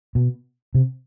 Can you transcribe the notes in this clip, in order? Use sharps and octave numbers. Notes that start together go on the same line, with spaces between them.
B2
C3